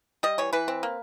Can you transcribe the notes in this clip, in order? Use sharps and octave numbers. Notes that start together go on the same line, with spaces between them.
G3 D#5
E3 C#5
E3 B4
C4
A#3